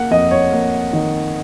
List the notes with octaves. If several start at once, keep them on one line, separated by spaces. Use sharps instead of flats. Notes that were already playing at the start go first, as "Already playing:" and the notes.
Already playing: A#3 F#5
F2 D#5
C#5
A#3
D#3